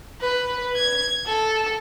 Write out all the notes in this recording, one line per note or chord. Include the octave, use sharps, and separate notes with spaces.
B4
G#6
A4